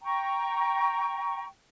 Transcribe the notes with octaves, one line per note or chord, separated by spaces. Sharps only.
G5 A#5 C#6